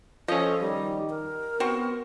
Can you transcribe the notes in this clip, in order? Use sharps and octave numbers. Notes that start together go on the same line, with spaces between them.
F3 C#4 A4 D#5
D#3 G3
A#4
B3 C4 F#4